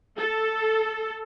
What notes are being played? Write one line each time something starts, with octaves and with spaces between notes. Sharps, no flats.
A4